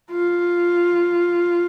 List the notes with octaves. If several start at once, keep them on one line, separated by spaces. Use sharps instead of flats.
F4